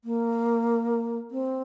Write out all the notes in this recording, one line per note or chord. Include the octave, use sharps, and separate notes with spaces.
A#3
C4